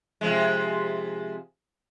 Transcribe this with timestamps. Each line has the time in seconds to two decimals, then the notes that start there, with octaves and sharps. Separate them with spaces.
0.21 C3 F3 G#3